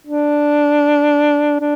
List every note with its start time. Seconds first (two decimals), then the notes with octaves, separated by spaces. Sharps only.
0.07 D4
1.60 D4